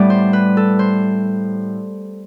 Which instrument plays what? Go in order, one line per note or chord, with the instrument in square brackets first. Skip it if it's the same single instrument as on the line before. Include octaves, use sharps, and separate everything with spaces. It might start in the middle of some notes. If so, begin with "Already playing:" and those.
Already playing: [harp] A2 G3 B3 D5
C5
B4
A4
C5